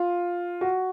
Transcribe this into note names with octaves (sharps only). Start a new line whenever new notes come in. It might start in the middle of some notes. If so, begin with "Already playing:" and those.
Already playing: F4
F#4